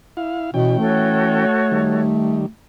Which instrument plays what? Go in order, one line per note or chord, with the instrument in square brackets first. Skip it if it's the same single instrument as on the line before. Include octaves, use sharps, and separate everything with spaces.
[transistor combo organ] E4 F5
[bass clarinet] B2 [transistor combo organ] E3 C#4 G5
[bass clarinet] A3 [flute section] F#4 A4 C#5
[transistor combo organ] D#3 G3